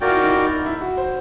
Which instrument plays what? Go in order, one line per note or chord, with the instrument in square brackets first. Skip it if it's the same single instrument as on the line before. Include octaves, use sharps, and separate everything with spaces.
[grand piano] F4 [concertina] F#4 A#4 D5 G5
[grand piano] E4
D#4
E4
D#4
E4
F#4
C5